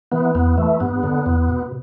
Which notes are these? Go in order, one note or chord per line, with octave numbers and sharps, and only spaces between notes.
E3 B3
E2 B3
E3 A3
G2 B3
D3
E2
B2